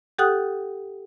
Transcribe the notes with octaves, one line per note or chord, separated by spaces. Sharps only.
G4 A4 F#5 G5 D#6 F#6